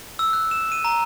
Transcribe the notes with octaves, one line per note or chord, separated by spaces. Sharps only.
E6
F#6
E7
D#7
A#5